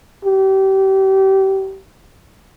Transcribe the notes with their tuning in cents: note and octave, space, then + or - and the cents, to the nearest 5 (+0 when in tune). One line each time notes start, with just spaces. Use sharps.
G4 -30